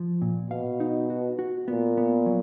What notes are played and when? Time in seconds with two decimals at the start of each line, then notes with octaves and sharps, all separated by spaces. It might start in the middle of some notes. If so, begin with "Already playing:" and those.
Already playing: F3
0.22 A#2
0.50 B2 F5
0.80 D#4
1.10 F#4
1.39 F#4
1.67 A#2 B3
1.97 B3
2.26 F#3